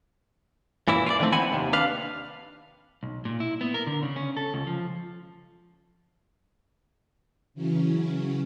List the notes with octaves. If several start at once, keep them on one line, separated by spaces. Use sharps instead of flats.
F#2 A#2 E3 E4
F4 D5
D3 D#3 F3 G#3 A3 C4
E3 C4 F#5 G#5 B5
D#2 C3
D4 B4 F5
B1
A#2
E4
B3
A#4
D3
C#3
C#4
A4
C#2
F3
C#3 E3 F#3 C#4